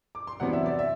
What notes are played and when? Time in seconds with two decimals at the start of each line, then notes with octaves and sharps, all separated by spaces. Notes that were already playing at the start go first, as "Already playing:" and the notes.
0.15 D6
0.27 C6
0.40 E2 C3 F#3 B3 D4 F#5
0.53 E5
0.66 D5
0.79 E5